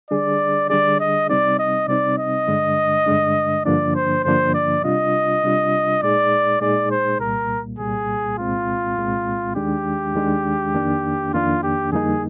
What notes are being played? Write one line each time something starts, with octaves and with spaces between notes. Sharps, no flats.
D3 G3 D4 G#4 D5
D3 G3 D4 G#4 D5
D#5
C3 G3 C4 D#4 D5
D#5
C3 G3 C4 D#4 D5
D#5
G2 D3 G#3 D4
G2 D3 G#3 D4
G2 D3 F3 A#3 D4 D5
C5
G2 D3 F3 A#3 D4 C5
D5
C3 G3 D4 F4 D#5
C3 G3 D4 F4
A#2 G#3 D#4 G#4 D5
A#2 G#3 D#4 G#4 D5
C5
C2 A#2 G3 A#3 A#4
C2 A#2 G3 A#3 G#4
C2 A#2 G#3 C4 F4
C2 A#2 G#3 C4
D#2 D#3 G#3 D4 G4
D#2 D#3 G#3 D4
F2 D#3 A#3 D4
F2 D#3 A#3 D4 F4
G4
F2 D3 G3 A#3 D#4 G#4